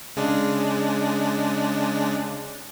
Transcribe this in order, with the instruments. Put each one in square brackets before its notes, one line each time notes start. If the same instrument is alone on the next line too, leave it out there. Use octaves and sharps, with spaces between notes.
[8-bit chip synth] C#3 G#3 D4